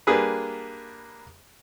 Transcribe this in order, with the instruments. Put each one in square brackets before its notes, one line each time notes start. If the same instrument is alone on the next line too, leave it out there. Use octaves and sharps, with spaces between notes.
[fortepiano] G3 A#3 D4 G#4 B4